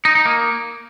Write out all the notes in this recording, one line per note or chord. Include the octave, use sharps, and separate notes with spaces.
D#4
D#4
A#3